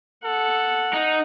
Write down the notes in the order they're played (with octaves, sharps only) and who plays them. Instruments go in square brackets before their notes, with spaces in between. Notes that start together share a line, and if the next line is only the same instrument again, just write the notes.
[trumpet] A4 [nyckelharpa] F#5
[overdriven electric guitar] D#4